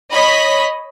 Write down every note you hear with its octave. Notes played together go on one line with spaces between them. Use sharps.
C#5 D#5 B5 B6